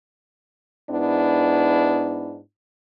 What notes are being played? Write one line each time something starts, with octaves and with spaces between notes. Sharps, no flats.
G#2 B3 D4 E4